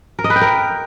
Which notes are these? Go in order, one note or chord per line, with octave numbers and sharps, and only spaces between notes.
A#4
D#5
B4
G5
A#4